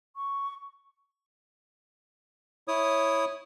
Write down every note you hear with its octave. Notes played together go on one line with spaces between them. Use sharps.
C#6
E4 C#5 D#6